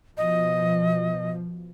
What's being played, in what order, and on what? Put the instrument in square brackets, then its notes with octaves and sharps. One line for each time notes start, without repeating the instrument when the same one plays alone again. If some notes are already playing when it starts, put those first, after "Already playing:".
[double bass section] B2 F3 [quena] D#5